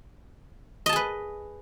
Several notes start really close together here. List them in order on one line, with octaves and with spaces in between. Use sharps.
D#5 A5 G#4 B4